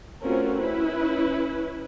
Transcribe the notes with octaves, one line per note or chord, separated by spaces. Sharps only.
A3 C4 C#4 F4 F#4 A#4
C#4 E4 B4